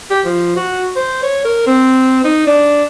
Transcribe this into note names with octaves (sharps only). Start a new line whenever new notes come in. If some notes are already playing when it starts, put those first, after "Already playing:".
G4
F3
F#4
C5
C#5
A#4
C4
D#4
D4